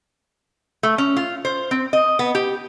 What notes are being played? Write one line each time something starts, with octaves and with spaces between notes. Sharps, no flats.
A3
C#4
F4
C5
C4
D#5
B3
G4